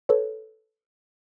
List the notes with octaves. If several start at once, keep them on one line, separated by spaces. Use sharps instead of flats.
A4 B4 C#5